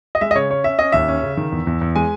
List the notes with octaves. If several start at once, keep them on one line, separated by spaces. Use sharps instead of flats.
D#5
G#3 E5
D#5
C#3 C#5
C#4 C#5
C#4 E5
C#4 D#5
D#2 E5
C#4
C#3
D#3
E2
E2
E2
G#3 G#5